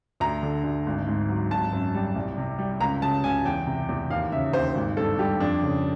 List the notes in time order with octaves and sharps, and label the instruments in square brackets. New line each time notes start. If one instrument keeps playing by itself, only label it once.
[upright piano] D2 A#5
D3
D2
G#1
G#2
F#3
G#1 A5
F#2
G3
C2
C3
G3
C#2 A#5
C#3 A5
C#2 G#5
E2 G5
C3
E2
D#2 F5
C#3 E5
D#2 C5
G#1
G2 A4
G3 G4
F2 D4
C#3